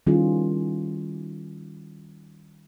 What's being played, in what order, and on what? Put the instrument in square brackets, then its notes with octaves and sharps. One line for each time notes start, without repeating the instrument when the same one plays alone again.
[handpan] D#3 G3 C#4 E4 F4 G#4